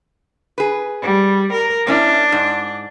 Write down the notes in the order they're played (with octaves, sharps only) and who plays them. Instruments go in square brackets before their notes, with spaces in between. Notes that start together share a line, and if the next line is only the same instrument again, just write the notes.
[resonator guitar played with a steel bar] G#4 B4
[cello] G3
A#4
[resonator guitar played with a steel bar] A#3 C#4 E4 [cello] D4
[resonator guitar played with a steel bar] G#2